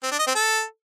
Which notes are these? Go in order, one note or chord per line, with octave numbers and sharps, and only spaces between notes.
C4
D4
D#5
C4
A4